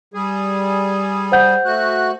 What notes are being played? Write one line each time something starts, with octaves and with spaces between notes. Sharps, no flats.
G3 G#4
C5 F#5 G6
A3 F#4 F#6